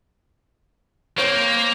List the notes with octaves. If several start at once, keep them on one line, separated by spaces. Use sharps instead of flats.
A#3 C4 C5 C#5